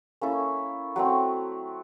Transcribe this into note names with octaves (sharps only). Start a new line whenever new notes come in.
A#3 C#4 E4 A4
F#3 A3 C4